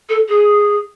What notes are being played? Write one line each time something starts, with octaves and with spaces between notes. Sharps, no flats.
A4
G#4